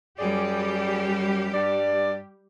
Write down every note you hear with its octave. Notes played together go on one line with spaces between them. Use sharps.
F#2 G3 G4 G#4 D5
G2 D5